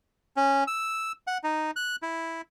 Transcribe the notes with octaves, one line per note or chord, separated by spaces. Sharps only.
C#4
E6
F#5
D#4
F#6
E4